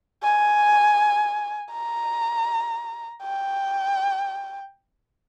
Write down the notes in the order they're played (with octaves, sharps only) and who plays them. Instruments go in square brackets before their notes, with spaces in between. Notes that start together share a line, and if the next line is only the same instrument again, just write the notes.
[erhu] G#5
A#5
G5